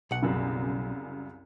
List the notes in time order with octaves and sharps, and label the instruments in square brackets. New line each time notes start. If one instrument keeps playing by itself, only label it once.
[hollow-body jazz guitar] B1 F#5
[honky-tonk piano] C2 F#2 C#3